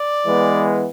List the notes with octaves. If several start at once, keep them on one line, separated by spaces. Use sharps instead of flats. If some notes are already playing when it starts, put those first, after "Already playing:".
Already playing: D5
E3 G#3 B3